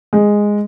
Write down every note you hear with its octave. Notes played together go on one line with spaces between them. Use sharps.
G#3